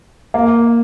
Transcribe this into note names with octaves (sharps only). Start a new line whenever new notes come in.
A#3